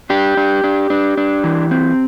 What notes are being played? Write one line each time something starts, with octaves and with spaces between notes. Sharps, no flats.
D4 G4
D4
D4
D4
D4
E3
C4